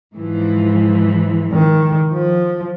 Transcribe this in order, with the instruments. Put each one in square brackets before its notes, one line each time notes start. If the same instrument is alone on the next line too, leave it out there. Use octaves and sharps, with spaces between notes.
[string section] G#2 E3 F3
[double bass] D#3
F3